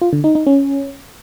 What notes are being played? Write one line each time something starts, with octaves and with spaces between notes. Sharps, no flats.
F4
D3
D#4
D#4
C#4